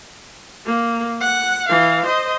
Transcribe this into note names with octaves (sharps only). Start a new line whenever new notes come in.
A#3
F#5
E3 F5
C5 D#5